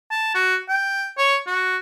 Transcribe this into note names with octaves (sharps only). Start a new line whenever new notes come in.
A5
F#4
G5
C#5
F#4